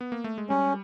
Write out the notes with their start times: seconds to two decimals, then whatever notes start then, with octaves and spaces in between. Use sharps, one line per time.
0.01 B3
0.12 A#3
0.24 A3
0.38 G#3
0.49 G3 C#4